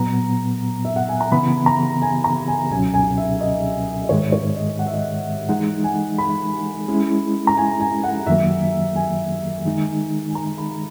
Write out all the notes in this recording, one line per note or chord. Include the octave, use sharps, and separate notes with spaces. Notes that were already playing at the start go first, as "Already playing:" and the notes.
Already playing: A#2 F#3 B3 A#5
E5
F#5
G#5
A#5
C#3 E3 B3 B5
A#5
G#5
A#5
G#5
C#2 B2 F#3 C#4 G#5
G#5
E5
D#5
D#5
G#2 D#3 G#3 C#5
C#5
D#5
F#5
E5
D#5
E5
E3 G#3 D#4 F#5
G#5
B5
G#3 C#4 E4
A#5
G#5
G#5
F#5
F#2 D#3 F#3 A#3 E5
G#5
D#3 G#3 D#4
G#5
A#5
B5